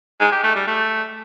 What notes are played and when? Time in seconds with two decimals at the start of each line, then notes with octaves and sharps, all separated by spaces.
0.20 G#3
0.32 G4
0.44 A3
0.56 G3
0.67 A3